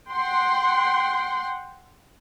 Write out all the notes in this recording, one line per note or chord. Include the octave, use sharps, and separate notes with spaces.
F#5 G5 C6